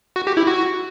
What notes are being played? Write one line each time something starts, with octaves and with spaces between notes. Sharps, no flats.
F#4
G4
E4
F#4